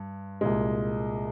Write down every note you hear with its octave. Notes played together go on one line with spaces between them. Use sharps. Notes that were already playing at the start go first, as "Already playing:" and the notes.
Already playing: G2
C2 A#2 G#3